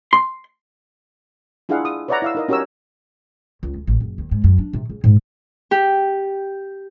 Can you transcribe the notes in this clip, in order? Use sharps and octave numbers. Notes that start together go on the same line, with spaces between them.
C6
D4 E4 F4 G#4 F5 F#5
D#6
B4 C#5 D5 E5 F#5 A#5
E4 F5 E6
D#4 A#4 D#5
C#4 F#4 G4 A#4 C#5 E6
C#2
D2
A1
F#1
D#2
G#2
F#2
D4
C3
C#3
G#2
G4